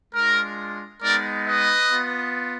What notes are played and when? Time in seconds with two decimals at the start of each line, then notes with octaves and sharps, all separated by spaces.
0.14 G#3 D4 F4 A#4
1.01 G#3 B3 D#4 A#4 D5
1.46 B4 D#5
1.90 B3 F4